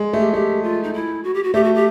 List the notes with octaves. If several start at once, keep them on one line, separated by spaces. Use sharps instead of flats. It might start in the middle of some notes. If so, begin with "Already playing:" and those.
Already playing: G#3
A3
G4
A3 G4
F4
D#4
E4
F#4
G4
F#4
A3 G4
F#4
G4